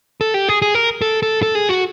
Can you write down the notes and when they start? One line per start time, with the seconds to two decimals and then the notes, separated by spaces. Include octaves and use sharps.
0.21 A4
0.34 G4
0.49 G#4
0.62 G#4
0.75 A#4
1.02 A4
1.23 A4
1.43 A4
1.55 G#4
1.69 F#4